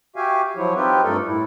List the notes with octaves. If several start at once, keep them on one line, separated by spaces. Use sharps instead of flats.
F#4 G4 E5 F5 G#5
F3 F#3 E4 C#5
C4 D#4 F4 G4 B4
G2 A3 A4 A#4
A2 E4